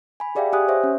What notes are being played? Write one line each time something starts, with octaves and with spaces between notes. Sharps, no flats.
G#5 B5
G4 G#4 D5 E5 F5 G5
G4 F#5 G#5 D#6 F#6
C5 C#5 E5
C#4